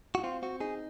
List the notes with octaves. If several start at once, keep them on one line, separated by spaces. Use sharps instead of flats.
F#4
C4 F4
C4 F#4
D#4 G#4